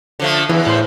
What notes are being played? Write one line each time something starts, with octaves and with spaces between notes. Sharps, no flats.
D3 F3 A3
E2 E3
A2 C5